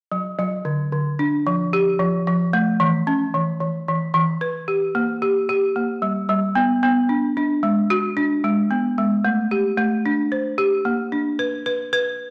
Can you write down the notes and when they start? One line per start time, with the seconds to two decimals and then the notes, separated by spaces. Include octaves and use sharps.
0.12 F#3
0.39 F#3
0.65 D3
0.92 D3
1.19 D4
1.47 F3
1.73 G4
1.99 F3
2.27 F3
2.53 A3
2.80 E3
3.07 C#4
3.34 E3
3.60 E3
3.88 E3
4.14 E3
4.41 B4
4.68 G4
4.95 A#3
5.22 G4
5.49 G4
5.76 A#3
6.02 G3
6.29 G3
6.55 B3
6.83 B3
7.09 D4
7.37 D4
7.63 G#3
7.90 F#4
8.17 D4
8.44 G#3
8.71 B3
8.98 G#3
9.25 A3
9.51 G4
9.78 A3
10.06 D4
10.32 C5
10.58 G4
10.85 A#3
11.12 D4
11.39 B4
11.66 B4
11.93 B4